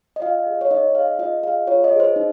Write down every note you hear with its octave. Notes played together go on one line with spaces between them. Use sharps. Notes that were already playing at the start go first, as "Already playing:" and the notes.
D#5
F4 F5
G#4
C#5
D#4 D#5
G#4 F5
F4 D#5
G#4 F5
F4 C#5
D#5
G#4
C5
D#4